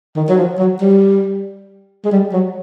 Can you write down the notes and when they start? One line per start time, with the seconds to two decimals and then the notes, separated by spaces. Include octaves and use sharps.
0.16 D#3
0.29 F#3
0.37 F3
0.59 F#3
0.81 G3
2.05 G#3
2.12 G3
2.33 F#3